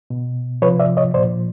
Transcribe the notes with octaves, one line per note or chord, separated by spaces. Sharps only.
B2
C3 F3 B4 C#5
D5 E5
C#5 D#5
A#2 F3 C5 D5